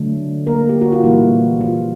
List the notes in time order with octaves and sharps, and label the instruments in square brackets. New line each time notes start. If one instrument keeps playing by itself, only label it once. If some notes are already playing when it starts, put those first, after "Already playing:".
Already playing: [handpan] D3 F#3 A3
A#3 A#4
G4
F#4
F4
A#2 E3 G3 A#3 E4
F3 F4